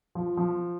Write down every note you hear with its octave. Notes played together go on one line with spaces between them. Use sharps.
F3
F3